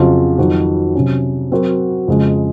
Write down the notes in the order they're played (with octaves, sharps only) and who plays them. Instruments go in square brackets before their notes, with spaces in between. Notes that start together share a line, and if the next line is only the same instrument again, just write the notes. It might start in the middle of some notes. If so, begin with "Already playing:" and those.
Already playing: [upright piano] F2 C#3 F#3 C4 F4
F2 D#3 F#3 C4 F#4
C3 F#3 C#4
F#3 C4 F#4 A#4
F2 C#3 G#3